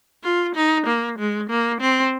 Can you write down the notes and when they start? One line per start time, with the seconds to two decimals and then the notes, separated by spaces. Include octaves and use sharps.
0.24 F4
0.55 D#4
0.86 A#3
1.18 G#3
1.50 A#3
1.81 C4